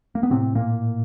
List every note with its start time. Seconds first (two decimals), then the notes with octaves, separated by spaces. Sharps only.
0.15 A#3
0.23 B3
0.30 A2 C3 C4
0.55 A#2 A#3